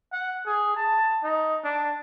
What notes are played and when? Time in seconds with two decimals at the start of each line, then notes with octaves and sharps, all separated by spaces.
0.12 F#5
0.46 G#4
0.76 A5
1.24 D#4
1.64 D4